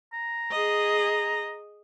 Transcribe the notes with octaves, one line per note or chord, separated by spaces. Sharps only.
A#5
G#4 D#5